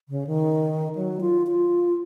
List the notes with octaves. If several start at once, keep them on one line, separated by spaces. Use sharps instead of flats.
C#3
D#3
F#3
F4
F4